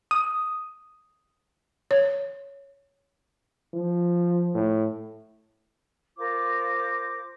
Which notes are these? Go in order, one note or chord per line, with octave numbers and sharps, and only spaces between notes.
D#6
C#5
F3
A2
F4 A#4 C5 D6